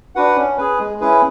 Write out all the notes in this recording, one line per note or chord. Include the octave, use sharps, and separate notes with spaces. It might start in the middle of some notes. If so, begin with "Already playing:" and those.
D4 F#4 B4 F#5
C#4
G#4 B4
G#3
C#4 E4 G#4 B4